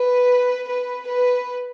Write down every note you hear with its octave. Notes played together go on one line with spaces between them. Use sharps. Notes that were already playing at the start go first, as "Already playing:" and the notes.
Already playing: B4
B4
B4